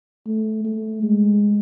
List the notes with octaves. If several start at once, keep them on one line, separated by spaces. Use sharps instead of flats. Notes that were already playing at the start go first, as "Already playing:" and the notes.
A3
A3
G#3